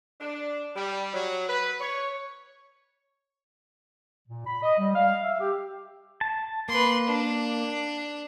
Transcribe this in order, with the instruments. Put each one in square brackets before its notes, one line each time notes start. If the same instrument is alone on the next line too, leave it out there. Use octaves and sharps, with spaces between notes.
[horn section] D4
G3
F#3
B4
C#5
[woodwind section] A#2
B5
D#5
G3
F5
E5
G4
[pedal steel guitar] A5
[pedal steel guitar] A#3 [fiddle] B4 C6
[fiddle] D4